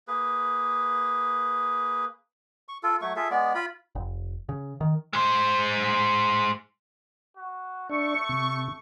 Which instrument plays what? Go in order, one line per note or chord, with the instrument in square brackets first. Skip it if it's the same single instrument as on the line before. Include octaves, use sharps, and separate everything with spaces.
[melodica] A#3 G#4 B4
C#6
F4 A4
F#3 A3 C#6
F4 G#4 A4 E5
G#3 B3 D5
F4 B5
[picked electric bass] F1
C#3
D#3
[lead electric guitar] G#3 C5
[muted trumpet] F#4
[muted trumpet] A3 [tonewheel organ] D4 [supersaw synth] C#6
[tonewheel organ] C3